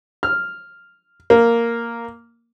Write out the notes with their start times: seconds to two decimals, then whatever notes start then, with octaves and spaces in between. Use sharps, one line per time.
0.23 F6
1.30 A#3